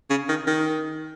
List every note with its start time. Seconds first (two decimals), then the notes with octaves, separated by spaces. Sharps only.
0.10 C#3
0.29 D#3
0.47 D#3